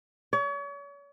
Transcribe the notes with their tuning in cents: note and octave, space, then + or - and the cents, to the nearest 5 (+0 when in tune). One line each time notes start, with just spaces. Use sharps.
C#5 +40